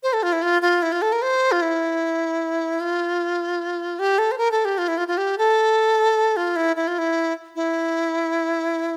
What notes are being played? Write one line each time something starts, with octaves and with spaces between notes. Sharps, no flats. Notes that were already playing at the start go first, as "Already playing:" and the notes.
C5
A4
F4
E4
F4
F4
E4
F4
A4
A#4
C5
F4
E4
F4
G4
A4
C5
A#4
A4
G4
F4
E4
F4
F4
G4
A4
F4
E4
E4
F4
E4
E4